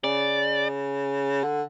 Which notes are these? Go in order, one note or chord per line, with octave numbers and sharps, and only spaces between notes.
C#3 D5
D3